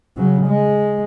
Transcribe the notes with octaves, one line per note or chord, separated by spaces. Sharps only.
C#3 F#3
G#3